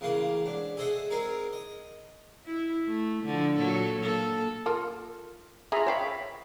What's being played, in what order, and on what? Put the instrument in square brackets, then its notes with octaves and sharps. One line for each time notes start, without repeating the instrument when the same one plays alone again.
[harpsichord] A1 C#3 A#3 F4 F#5
G#2 D4
G#4 A4 C5 D#5 E5 F#5
G#3 C4 D#4 G#4 A#4
D#5
[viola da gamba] E4
A3
D3 F3
A#2 F#3 A4
A#3 A4
[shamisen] F4 A4 A#4
[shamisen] F4 G#4 [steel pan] E5 A#5 B5
[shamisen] C5 F5 G5 [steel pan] C#5 B5